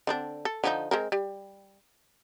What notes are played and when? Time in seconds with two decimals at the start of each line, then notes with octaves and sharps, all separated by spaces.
0.07 D3 C4 D4
0.45 A4
0.64 D3 F3 D#4
0.91 G#3 C4 A#4
1.12 G3